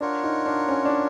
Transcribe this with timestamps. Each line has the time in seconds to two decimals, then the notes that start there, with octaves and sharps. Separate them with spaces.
0.01 D4 F4 A#4 C#5 F#5
0.24 D#4
0.46 D4
0.69 C#4
0.85 D4